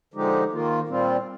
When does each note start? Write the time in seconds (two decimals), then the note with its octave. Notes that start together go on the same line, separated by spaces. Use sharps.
0.14 D3 F3 G#3 D#4 G4
0.52 D#3 A#3 F4
0.87 A#2 G3 C4 F4